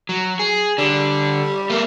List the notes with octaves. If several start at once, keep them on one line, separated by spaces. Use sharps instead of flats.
F#3
G#4
D3 G3
A3 A#3